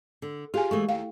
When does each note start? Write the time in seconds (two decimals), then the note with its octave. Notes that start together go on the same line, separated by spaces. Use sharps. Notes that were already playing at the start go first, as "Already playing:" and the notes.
0.22 D3
0.54 F4 G4 G#4 G#5
0.71 E3 G#3 A3 C#6
0.89 D#2 F5 G5